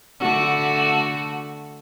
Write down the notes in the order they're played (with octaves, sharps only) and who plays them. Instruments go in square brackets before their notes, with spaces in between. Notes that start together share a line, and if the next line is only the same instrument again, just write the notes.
[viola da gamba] D3 A3 F#4